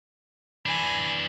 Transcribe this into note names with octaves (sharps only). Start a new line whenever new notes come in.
E3 D4 G#5 B5